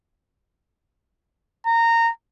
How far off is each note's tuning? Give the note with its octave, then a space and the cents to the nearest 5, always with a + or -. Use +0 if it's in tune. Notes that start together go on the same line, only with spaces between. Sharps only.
A#5 -20